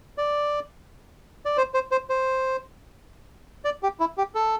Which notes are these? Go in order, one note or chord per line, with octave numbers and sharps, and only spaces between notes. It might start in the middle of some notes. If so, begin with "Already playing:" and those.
D5
D5
C5
C5
C5
C5
D5
G4
E4
G4
A4